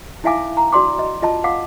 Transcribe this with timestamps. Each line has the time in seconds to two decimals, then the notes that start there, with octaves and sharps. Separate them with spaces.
0.24 D#4 E4 E5 F5 G#5 D6
0.57 A#5
0.72 D4 F#4 D5 C6 D6
0.99 D#5
1.22 F4 D#5 A5
1.44 F5 F#5 D6